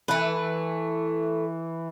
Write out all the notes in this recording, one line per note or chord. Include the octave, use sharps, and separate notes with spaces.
E3 A3 B4